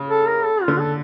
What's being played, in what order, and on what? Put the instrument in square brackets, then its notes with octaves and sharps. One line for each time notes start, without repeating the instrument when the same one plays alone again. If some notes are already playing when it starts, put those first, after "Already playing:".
Already playing: [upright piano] C#3
[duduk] A4
A#4
A4
F4
[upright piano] D3
[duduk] A4